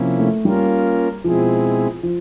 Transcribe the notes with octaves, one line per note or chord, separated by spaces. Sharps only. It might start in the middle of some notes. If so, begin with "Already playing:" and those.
Already playing: C3 F3 A#3 C#4 E4
A3
G3 A#3 C#4 F4 A#4
B2 F3 G#3 C4 E4 G#4
F3